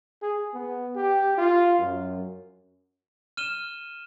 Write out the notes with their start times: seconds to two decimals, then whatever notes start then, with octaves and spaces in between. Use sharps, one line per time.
0.22 G#4
0.54 B3
0.95 G4
1.38 F4
1.79 F#2
3.37 F6 D#7 E7 G7